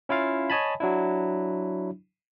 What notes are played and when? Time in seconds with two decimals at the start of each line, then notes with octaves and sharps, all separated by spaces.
0.09 C#4 E4 F4 F5
0.50 C#5 D#5 G#5 A5 B5
0.80 F#3 D4 E4